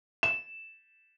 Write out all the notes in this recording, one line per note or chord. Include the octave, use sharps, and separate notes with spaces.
E7